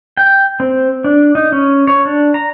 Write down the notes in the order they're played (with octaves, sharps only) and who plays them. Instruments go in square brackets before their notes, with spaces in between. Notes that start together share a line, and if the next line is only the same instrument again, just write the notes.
[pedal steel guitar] G5
C4
D4
D#4
C#4
C#5
D4
A#5